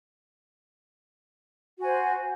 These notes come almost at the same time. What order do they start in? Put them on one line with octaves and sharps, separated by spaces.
F#4 G#5 C5